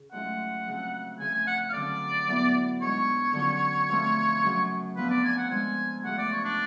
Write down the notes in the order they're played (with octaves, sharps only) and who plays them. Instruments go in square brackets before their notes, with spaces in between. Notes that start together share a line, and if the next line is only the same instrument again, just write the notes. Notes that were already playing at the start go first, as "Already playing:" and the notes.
Already playing: [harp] C#3
[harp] G#2 F#3 A3 C#4 F4 [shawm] F#5
[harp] F2 C#3 F#3
[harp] C#3 F3 A3 [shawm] G#5
[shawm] G#5
F#5
F5
[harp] F2 D3 F#3 C#4 [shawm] D5
[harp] A2 F#3 B3
[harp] G#2 G#3 D4 [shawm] C#5
[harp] D3 F#3 C#4 F4
F2 F3 A3 F4
F#2 C#3 F#3
[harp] F2 F3 B3 D4 [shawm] B4
[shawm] D5
G#5
F#5
[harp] F3 G#3 D4 F4 [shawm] G#5
[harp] F#2 C#3 F3 A3 F4 [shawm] F#5
[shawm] D5
C#5
D4